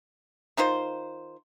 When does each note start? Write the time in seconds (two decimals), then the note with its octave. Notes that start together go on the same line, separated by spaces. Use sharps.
0.57 D#3 D#4 F4 C5